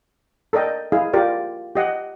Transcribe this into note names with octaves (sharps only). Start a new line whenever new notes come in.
A4 A#4 D5 D#5 G5
E4 G#4 D#5 F5
F4 G4 A#4 D5
G4 D#5 F#5